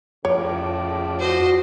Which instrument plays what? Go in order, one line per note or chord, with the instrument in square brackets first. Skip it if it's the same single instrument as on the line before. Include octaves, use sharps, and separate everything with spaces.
[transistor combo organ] F2 D5 [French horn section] A2 C#3 [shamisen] C#5
[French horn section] F#4 [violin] C5 D#5